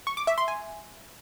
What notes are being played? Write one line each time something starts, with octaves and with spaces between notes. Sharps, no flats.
C#6
D6
E5
C6
G#5